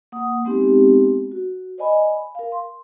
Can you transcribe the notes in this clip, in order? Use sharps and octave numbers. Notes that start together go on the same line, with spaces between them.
A#3 F#5 D#6
G#3 B3 C4 D#4 G4
F#4
C5 D5 D#5 G#5 B5
A#4 F5
C6